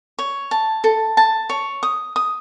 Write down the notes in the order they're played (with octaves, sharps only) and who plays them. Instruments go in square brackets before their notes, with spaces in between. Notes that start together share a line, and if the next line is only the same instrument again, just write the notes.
[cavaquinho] C#5
A5
A4
A5
C#5
D#6
D#6